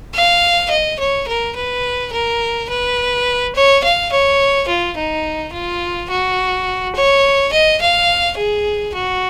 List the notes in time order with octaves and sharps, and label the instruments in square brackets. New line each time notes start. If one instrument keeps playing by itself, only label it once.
[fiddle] F5
D#5
C#5
A#4
B4
A#4
B4
C#5
F5
C#5
F4
D#4
F4
F#4
C#5
D#5
F5
G#4
F#4